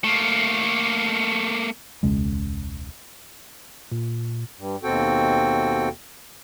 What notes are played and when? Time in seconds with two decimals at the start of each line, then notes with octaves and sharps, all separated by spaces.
0.04 A3 A#3
2.03 E1 C#2 C#3 G#3
3.92 A#2
4.57 G2
4.83 D#2 B2 C4 F#4 A4 G5